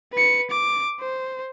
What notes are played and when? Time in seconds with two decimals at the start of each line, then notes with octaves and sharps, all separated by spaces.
0.13 B4 C#7
0.50 D6
1.00 C5